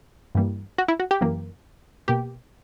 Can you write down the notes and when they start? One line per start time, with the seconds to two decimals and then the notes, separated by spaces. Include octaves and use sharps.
0.35 G2 E3 G3 A#3
0.78 F#4
0.88 E4
1.00 F#4
1.11 G4
1.21 F#2 E3 A#3
2.08 B2 A#3 G4